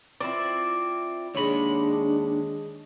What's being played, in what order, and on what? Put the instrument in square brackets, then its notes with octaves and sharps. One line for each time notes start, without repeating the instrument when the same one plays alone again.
[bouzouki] F3 C4 E4 [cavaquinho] D5
[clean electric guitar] D#2 B5 [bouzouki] G#3 C#5 [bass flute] D4